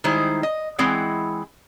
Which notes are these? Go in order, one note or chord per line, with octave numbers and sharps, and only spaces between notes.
D#3 G3 G#3 D#4 E4 C5
D#5
E3 G#3 C4 E4 F#5